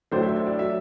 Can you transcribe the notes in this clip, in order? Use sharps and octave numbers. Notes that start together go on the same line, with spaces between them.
A1 A2 F#3 A3 D4 C5
E5
E5
D5
F#3 E5